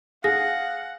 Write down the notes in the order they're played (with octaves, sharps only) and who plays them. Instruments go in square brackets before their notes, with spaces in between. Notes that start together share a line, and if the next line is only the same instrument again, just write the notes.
[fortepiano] G#4 [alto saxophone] F5 [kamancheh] F#5 [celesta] A#6